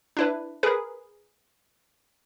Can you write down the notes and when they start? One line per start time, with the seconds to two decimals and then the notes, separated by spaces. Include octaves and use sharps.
0.17 D4 E4 B4
0.63 G#4 A#4 B4